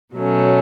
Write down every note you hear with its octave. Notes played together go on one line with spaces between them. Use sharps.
B2 F#3 A3 C#4